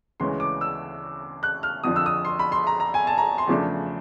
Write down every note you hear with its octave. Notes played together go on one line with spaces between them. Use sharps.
D2 C#3 E3 G#3 C#4 C6
D6
E6
F#6
F6
F2 D3 F3 D#6
E6
D#6
C6
B5
C6
A#5
A#5
G#5
A5
A#5
C6
E2 C#3 F3 A3 D4